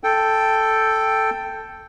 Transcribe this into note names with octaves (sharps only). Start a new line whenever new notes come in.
A4 G5